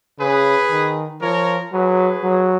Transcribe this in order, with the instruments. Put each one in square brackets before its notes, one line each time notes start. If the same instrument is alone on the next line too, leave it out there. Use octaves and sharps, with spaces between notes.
[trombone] C#3 [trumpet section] G#4 B4
[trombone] D#3
[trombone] F3 [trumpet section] A#4 C#5
[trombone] F#3 [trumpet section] G#4 B4
[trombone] F#3